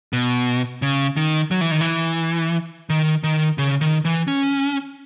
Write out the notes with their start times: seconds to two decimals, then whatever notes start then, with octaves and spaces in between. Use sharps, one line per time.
0.13 B2
0.82 C#3
1.17 D#3
1.51 F#3
1.61 E3
1.71 D#3
1.81 E3
2.90 D#3
3.24 D#3
3.58 C#3
3.81 D#3
4.05 E3
4.28 C#4